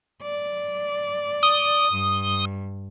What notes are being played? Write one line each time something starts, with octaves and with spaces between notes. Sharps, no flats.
D5
D#6
G2